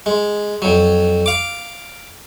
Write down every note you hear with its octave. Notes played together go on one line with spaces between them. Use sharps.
G#3
F2 F#3
F5 D6